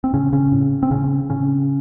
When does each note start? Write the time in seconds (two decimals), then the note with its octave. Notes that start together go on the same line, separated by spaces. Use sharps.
0.04 C4
0.13 A2 C#3 C#4
0.33 C#3 C#4
0.52 A2
0.83 C4
0.91 A2 C#3 C#4
1.30 A2 C#3 C#4